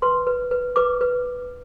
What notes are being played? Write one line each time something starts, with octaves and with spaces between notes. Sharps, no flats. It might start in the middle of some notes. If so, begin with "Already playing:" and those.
B4 C6
B4
B4
B4 D6
B4